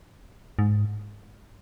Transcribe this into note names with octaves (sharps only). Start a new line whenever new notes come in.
G#2